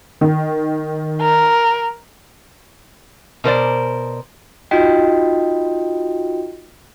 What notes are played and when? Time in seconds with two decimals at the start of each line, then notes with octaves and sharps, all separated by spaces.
0.21 D#3
1.21 A#4
3.44 B2 A#4 C5 D5
4.71 D#4 F4 F#4 D#5 G5